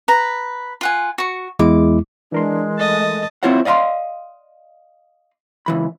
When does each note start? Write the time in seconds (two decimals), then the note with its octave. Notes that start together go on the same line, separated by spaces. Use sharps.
0.08 B4 A#5
0.81 F4 F#5 G#5
1.18 F#4 C#6
1.59 E2 G#3 E4 D6
2.32 E3 G#3 D4 A#4 C6
2.78 A3 D#5 A5
3.43 C4 E4 F4 C5 C#5 F#5
3.65 D5 D#5 F5 A#5 C6
5.66 C#2 E3 B5